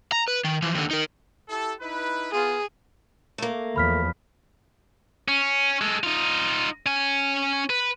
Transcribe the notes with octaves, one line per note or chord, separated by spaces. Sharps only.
A#5
B4
D#3
E3 F3
D#2 D3
D#4 A#4
E4 G4 A4
D#4 E4 B4
B3 F4 G#4
A3 A#3
E2 F3 B5 F6 B6
C#4
G#3 A4
D#4 F4
C#4 G#5
B4